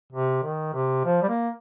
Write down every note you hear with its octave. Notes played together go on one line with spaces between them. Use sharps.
C3
D#3
C3
F3
G3
A#3